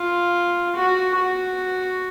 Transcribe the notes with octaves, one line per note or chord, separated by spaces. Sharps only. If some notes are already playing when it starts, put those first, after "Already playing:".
Already playing: F4
F#4
F#4